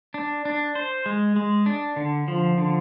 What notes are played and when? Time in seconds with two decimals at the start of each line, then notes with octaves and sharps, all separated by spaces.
0.14 D4
0.45 D4
0.75 C5
1.06 G#3
1.36 G#3
1.66 D4
1.96 D3
2.28 F3
2.58 D3